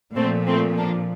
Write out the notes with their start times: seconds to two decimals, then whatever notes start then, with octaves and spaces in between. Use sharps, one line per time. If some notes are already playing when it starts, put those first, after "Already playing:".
0.16 A#2 F3 A3 C4
0.47 A3 C4
0.78 A#3 D4